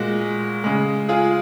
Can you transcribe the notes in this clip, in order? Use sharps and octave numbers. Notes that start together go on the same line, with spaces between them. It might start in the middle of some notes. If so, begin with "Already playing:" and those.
Already playing: A#2 G#3 F#4
C#3 G#3
F4 G#4